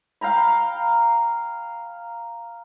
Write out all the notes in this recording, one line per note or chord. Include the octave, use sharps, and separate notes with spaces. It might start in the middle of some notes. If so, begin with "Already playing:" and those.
F5 G5 A#5 B5